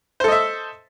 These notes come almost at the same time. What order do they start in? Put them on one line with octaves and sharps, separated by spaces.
C5 A4 D#5 E5